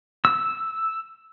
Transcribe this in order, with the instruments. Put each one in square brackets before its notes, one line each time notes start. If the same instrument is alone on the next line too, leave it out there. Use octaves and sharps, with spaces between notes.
[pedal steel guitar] E6